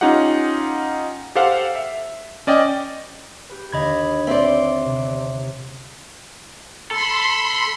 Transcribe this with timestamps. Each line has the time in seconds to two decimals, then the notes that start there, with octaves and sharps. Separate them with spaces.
0.01 C#4 D#4 F4 G4 F#5
1.35 G4 A4 C5 F5 F#5
1.76 E5
2.47 C#4 D5 D#5 G5
3.49 G4 B4
3.73 D#2 D3 D#5 B5 G#6
4.27 C4 D5 E5 C6
4.85 C3 B3
6.91 A4 B5 C6